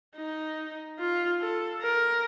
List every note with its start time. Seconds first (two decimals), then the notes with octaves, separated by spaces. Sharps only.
0.17 D#4
1.00 F4
1.41 A4
1.82 A#4